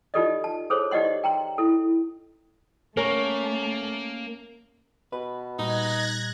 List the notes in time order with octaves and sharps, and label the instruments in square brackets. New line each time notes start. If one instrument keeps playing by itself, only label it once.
[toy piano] D#4 F4 G4 A4 D5 D#5
A5
G#4 A4 C5 C#5
D#4 G4 D5 D#5 F#5 C6
G5 A#5 C6
E4 A4
[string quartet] A3 [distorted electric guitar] A#3 [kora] C#4 A#4 F#5
[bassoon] B2 [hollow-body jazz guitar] B4
[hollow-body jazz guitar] A#2 G3 [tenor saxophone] D#4 [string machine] F#6 G#6 A#6